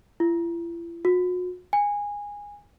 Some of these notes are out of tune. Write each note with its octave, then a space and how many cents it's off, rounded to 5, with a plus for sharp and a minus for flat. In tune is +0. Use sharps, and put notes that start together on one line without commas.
E4 +45
F#4 -40
G#5 -15